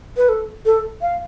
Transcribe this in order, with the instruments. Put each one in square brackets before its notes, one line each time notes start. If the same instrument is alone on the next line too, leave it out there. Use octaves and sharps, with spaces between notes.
[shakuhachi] B4
A4
A4
F5